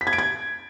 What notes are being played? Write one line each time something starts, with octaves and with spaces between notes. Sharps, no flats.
B6
G#6
D7
G#6